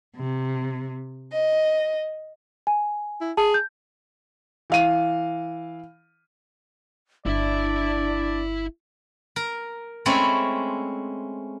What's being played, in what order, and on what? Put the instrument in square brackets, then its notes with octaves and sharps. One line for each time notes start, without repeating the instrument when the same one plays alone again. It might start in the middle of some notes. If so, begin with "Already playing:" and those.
[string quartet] C3
D#5
[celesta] G#5
[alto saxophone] E4
[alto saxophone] G#4 [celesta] A5
[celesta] G6
[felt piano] E3 F5 D#7
[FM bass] G1 [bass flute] D4 [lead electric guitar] E4 E5 [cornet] D5
[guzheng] A#4
G#3 A3 C4 C#4 E4